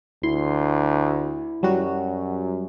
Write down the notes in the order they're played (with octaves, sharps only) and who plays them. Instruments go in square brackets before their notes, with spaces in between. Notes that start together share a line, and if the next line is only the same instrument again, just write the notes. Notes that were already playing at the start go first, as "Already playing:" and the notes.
[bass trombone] D2 [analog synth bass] E4 [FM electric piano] C6
[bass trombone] F#2 [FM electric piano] F#3 G3 F#4